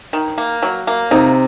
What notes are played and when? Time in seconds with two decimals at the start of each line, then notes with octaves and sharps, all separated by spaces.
0.13 D#3
0.38 A#3
0.63 F#3
0.87 A#3
1.11 C3 D#4